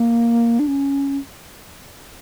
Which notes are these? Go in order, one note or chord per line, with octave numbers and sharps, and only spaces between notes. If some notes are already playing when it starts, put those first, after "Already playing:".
Already playing: A#3
D4
C#4